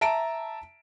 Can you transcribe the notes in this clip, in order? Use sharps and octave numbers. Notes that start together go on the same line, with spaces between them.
E5 A5 A#5 D7